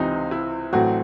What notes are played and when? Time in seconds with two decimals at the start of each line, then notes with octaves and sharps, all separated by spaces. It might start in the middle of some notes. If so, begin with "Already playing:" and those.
Already playing: C#2 C3 E3 C4 D#4
0.31 E4
0.73 A1 A2 F#3 A3 C4 F#4